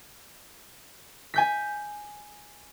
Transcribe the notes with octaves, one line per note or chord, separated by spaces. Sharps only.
G#5 G6 B6